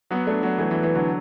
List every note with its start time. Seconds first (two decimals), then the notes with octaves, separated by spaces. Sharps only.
0.11 F#3 B3
0.27 A3 D4
0.43 F#3 B3
0.58 E3 A3
0.71 E3
0.83 E3
0.95 D3 F#3